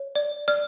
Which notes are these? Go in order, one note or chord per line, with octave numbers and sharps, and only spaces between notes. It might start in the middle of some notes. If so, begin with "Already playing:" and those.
Already playing: C#5
D5
D5 F6